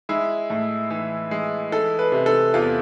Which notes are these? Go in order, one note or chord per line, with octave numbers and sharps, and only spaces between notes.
G#3 E4
A2
E3
G#3
E3 A4
B4
C3
A4
E2 F4